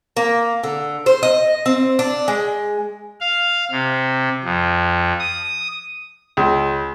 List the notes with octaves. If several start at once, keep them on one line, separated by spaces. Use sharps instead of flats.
A#3
D3
C5
D#5
C4
D4
G#3
F5
C3
F2
D#6
C#2